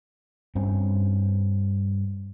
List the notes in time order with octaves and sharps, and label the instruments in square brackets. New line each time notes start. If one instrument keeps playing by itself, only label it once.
[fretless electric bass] G2 C4 C#4